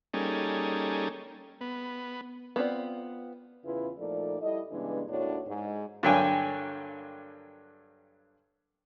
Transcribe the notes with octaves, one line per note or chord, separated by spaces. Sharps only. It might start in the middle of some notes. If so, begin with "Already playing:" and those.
G3 A#3 C#4 D#4 G#4 A4
B3
B3 C4 F4 D5
E2 C#3 E4 F4 B4
A#2 F3 A3 D#4 A4 D5
G3 E4 A4 D#5
G2 C#3 E3 G#3 B3 D4
D#2 A2 D4 F#4 C#5
G#2 G#3
G2 D3 F#3 A#3 G5 G#5